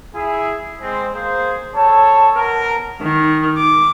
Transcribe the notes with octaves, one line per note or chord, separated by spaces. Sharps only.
E4 G#4
G#3 C4
A#3 G#4 C5
A4 C#5 A5
B3 A#4
D#3
D6